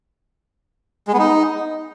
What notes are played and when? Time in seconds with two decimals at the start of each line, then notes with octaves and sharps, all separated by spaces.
1.08 G#3
1.13 B3
1.19 D#4